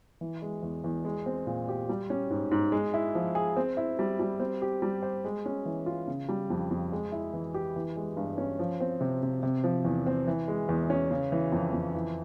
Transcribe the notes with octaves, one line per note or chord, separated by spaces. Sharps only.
E3
G#3
E2
E2
G#3
C4
A#2
G4
G3
C#4
G#2
G#2
G#3
E4
F3
G#4
C4
E4
G3
G3
C4
G4
G3
C5
G#3
C#4
E3
F4
C#3
G3
F2
F2
G#3
E4
E3
G4
E3
G#3
G2
C#4
F3
C4
C3
C3
C3
F3
E2
C4
E3
G#3
E2
C#4
C#3
E3
F2
F2
E3